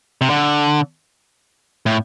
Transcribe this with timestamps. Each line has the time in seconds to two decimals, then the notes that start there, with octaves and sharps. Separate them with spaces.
0.21 C3
0.30 D3
1.86 A2